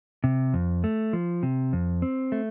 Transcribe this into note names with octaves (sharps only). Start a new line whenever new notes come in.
C3
F2
A3
F3
C3
F2
C4
A3